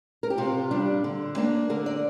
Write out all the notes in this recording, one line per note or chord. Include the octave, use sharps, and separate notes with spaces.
A#4
G4
C3 F4
G3 D4
D3
A#3 D4
D3 A#4
D5